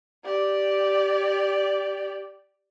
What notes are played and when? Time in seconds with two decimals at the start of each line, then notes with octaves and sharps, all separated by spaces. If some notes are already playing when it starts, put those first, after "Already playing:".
0.25 G4 D5